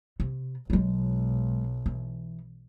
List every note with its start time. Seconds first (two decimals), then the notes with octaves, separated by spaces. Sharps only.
0.20 C3
0.70 B1 F#3 G#3
1.86 E3